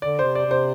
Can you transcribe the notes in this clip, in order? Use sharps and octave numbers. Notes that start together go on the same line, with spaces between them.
D3 D5
C3 C5
D5
C3
C5